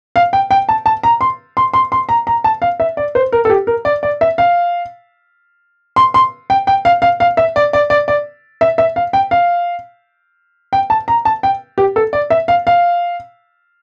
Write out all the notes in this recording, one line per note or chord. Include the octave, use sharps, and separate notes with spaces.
F5
G5
G5
A5
A5
A#5
C6
C6
C6
C6
A#5
A#5
A5
F5
E5
D5
C5
A#4
A4
G4
A#4
D5
D5
E5
F5
C6
C6
G5
G5
F5
F5
F5
E5
D5
D5
D5
D5
E5
E5
F5
G5
F5
G5
A5
A#5
A5
G5
G4
A4
D5
E5
F5
F5